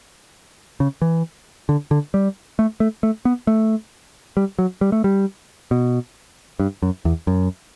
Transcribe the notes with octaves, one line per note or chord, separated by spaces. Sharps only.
C#3
E3
D3
D3
G3
A3
A3
A3
B3
A3
G3
F#3
G3
A3
G3
B2
G2
F#2
E2
F#2